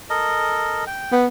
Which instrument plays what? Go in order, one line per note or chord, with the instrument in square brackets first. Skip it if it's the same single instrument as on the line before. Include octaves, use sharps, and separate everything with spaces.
[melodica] A4 A#4 D#5
G5
[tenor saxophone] B3